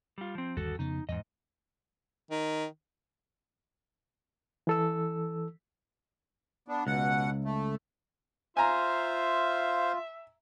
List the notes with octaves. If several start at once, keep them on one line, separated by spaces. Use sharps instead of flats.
G3 F4
F3 C4
G1 D#2 G3 F#4 A4
F2 C#3 B3 D#4
E2 G#2 D#3 D#5
D#3
E3 A4 E6
B3 D4
C#2 B2 F#5
A3
F4 C5 E5 F5 G#5 A#5